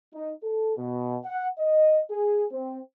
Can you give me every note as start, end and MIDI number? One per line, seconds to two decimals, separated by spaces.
0.13 0.32 63
0.43 0.74 69
0.77 1.17 47
1.24 1.47 78
1.58 2.00 75
2.10 2.45 68
2.51 2.80 60